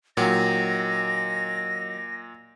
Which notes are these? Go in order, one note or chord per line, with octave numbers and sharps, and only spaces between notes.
A#2 D#3 F#3 A#6